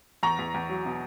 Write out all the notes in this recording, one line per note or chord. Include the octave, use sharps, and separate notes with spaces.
E2 A#5 C#6
E2
E2
F#3
B2